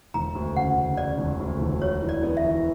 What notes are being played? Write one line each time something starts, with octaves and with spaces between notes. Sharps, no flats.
E1 A#5
D2
C#3 F#5
C#3
C#3 D5
E1
D2
E1
F#4 C#5
E3
D5
B3
E5
E3